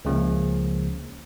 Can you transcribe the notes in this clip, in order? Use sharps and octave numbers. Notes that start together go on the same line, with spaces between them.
C#2 C#3 F3 A#3